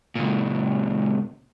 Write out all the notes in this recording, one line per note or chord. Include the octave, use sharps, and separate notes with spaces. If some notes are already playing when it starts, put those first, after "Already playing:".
C#2 A#2